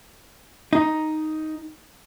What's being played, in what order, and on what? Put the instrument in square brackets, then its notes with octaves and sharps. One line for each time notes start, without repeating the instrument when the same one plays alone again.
[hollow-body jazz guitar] D#4